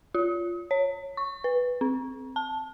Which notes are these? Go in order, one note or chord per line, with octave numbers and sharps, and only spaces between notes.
F4
C#5
C#6
B4
C4
A5